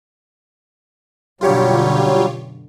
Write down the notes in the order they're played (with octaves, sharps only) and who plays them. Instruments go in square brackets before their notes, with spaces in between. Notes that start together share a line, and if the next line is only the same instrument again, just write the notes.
[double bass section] F#2 B2 D3 [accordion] F#3 G3 [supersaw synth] F4 G4 C#5